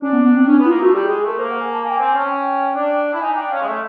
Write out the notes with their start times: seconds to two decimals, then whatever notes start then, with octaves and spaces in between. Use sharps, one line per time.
0.02 C#4 D4
0.13 B3
0.25 B3
0.36 C4
0.47 C#4 D4
0.59 B3
0.65 E4
0.70 A#3 F4
0.81 A3 F#4
0.93 G3 G4
1.04 G#4
1.08 G#3
1.16 G#4
1.23 A3
1.28 A#4
1.39 A#3 C5
1.51 F#5
1.61 G#5
1.73 A5
1.84 A#3 G#5
1.90 G5
1.95 G#5
1.99 C4
2.07 G#5
2.14 C#4 A5
2.30 G5
2.75 D4
3.13 E4
3.21 D#4 G#5
3.36 D4 G5
3.51 C#4 F5
3.61 G#3
3.66 A3 E5